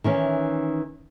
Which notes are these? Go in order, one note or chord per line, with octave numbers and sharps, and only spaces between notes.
D#3 E3 C#4